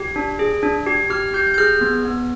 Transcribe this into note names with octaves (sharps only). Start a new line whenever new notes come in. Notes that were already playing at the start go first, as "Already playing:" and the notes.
Already playing: G4
D4
G#4
D4
G4
G4 F6
G4 G6
G6
G#4 F6
B3
B3